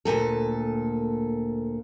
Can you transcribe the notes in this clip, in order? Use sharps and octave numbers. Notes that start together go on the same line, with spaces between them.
D2 G2 A#2 A4